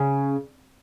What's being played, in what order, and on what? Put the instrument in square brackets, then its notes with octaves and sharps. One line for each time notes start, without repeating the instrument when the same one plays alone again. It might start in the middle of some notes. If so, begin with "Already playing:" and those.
Already playing: [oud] C#3